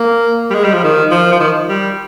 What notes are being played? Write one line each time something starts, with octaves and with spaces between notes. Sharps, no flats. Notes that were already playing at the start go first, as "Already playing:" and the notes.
Already playing: A#3
G3
G#3
G3
F3
D#3
F3
F3
D#3
G3